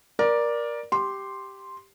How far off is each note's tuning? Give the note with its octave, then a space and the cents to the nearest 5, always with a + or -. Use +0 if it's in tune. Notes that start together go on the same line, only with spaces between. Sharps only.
A#4 +20 D5 +0
G4 +0 C6 +0